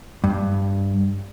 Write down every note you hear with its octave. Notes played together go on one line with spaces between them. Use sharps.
G2